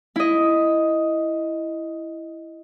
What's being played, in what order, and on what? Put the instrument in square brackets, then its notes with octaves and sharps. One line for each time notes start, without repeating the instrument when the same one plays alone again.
[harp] E4 D#5